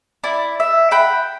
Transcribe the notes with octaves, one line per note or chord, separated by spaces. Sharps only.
E4 D5
E5
F#5 G5 B5